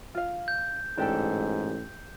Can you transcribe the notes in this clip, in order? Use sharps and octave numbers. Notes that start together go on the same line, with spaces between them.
F4 F5
G6
A1 G#2 D4 G4 A4